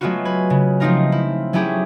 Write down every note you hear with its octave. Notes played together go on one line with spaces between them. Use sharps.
F#3 G#3 A3 B3 F4 F#4
B4 G#5
C#3
F3 A3 C4 D#4 F4 A#4
E4
F#3 A3 C#4 E4 G4 G#4